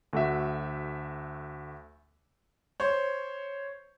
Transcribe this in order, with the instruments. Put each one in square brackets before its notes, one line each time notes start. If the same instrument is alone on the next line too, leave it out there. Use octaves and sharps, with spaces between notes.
[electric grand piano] D2 A3 F#4 E5
[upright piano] C5 C#5